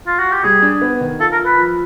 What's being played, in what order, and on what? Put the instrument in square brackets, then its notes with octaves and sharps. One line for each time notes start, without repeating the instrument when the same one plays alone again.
[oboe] F4
F#4
G4
[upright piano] G3 [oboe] G#4
[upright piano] D4
B3
D#3
[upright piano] F4 [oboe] A4
[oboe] A#4
[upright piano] F4
[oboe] B4
[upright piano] F3